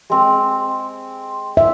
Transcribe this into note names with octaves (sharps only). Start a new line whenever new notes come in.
G#3 C4
E5